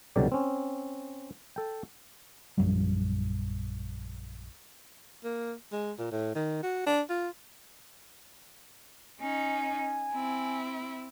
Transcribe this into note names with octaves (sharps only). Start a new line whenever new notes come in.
C2 B2 D3 F#3 G4 D5
C4 C#4
A4 G5
A#1 F#2 F3 G3
A#3
G#3
A#2
A2
D#3
F#4
D4
F4
C#4 D#4 G#5
C4 E4